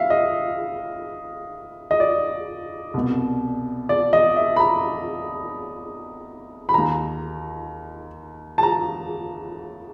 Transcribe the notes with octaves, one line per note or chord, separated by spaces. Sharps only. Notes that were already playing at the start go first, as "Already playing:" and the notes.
Already playing: E5 F5
D#5
D#5
D5
C2 B2
D5
D#5
E5
B5
A#5
B5
D#2 D#3 A#5
A5
A#5